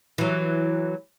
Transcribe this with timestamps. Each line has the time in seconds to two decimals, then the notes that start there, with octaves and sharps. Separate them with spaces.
0.18 E3 F#3